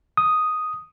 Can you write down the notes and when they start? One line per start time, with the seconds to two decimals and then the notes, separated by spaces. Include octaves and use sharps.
0.17 D#6